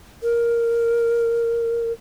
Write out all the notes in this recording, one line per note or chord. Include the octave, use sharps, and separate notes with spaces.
A#4